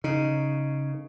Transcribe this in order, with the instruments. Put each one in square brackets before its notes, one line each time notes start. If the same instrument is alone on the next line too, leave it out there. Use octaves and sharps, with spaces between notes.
[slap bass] C#3 [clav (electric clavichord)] D#4